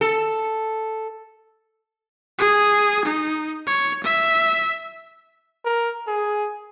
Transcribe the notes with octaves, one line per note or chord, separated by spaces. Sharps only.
A4
G#4
D#4
C#5
E5
A#4
G#4